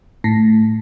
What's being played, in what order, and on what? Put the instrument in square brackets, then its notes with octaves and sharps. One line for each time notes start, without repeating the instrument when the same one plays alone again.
[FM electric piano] A2